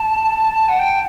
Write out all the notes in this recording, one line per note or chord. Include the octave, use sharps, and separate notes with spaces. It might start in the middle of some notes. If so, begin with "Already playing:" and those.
Already playing: A5
F#5
G5